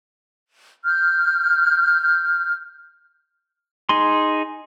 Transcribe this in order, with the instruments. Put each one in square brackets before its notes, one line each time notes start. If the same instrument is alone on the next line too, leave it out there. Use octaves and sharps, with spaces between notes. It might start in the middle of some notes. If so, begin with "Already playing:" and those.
[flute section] F6 G6
[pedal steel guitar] D#4 G#4 C6